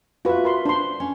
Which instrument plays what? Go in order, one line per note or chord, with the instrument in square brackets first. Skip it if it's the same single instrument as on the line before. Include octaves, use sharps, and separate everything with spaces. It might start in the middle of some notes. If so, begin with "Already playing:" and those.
[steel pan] F4 B4 [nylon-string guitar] F#4 E5
[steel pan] A#4 B5 C6
[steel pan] D4 C6 [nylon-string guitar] C5
[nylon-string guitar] C#4